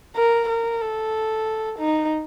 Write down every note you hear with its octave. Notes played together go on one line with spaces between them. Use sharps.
A#4
A#4
A4
D#4